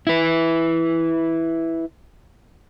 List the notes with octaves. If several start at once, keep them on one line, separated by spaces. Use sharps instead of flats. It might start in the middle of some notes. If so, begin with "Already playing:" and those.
E4 B4